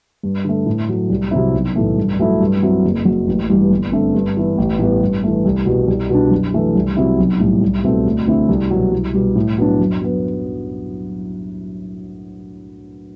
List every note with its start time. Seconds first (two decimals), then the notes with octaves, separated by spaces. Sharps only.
0.23 G2
0.45 D3 A3
0.66 A2
0.89 F#3 A3
1.10 C2
1.31 C3 F#3 C4 E4
1.54 B1
1.76 A2 E3 A3
1.97 G2
2.19 F#3 A3 E4
2.40 G2
2.63 F#3 C4 E4
2.85 F#1
3.05 F#2 F#3
3.27 A1
3.50 G2 E3 G3
3.71 G1
3.92 G2 D3 A3 C4
4.14 G2
4.37 E3 B3 E4
4.58 A1
4.79 A2 G3 B3 E4
5.02 G2
5.23 E3 A3
5.45 C2
5.66 B2 G3
5.88 C2
6.10 B2 G3 D4
6.31 F#2
6.54 E3 A3
6.75 C2
6.97 C3 F#3 C4 E4
7.18 B1
7.40 A2 G3
7.61 C2
7.84 B2 A3 C4
8.06 D2
8.27 D3 A3 C4 E4
8.49 C2
8.71 B2 F#3
8.92 C2
9.14 B2 G3
9.36 A2
9.58 F#3 B3 D4
9.80 F#2
10.02 F#3 B3